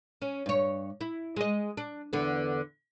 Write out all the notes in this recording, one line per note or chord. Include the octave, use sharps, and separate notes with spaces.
C#4
G2 C#5
E4
G#3 D#5
D4
E2 D3 B3